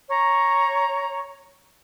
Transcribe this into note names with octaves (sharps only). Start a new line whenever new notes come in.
C#5 A#5